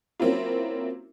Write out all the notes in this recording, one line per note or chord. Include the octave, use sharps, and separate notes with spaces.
F#3 A#3 C4 C#4 E4 F4